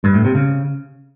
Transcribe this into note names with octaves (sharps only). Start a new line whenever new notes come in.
G2
A2
C3
C#3